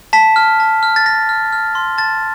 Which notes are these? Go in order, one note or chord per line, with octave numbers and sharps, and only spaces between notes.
A5 B6
F6
A5
F6
A6
F6 A#6
F6
F6
C6
A5 A6